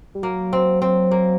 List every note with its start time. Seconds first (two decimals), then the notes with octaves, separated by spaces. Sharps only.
0.15 G3
0.22 F#3 A#3
0.53 C4
0.82 C4
1.11 A#3